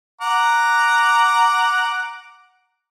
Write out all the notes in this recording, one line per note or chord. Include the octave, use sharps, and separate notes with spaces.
F#5 A#5 D6